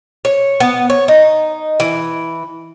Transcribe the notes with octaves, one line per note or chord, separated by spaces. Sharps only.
C#5
B3
C#5
D#4
E3